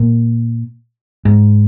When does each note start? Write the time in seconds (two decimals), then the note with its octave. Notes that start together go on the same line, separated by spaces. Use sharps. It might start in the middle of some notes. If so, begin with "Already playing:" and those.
Already playing: A#2
1.25 G#2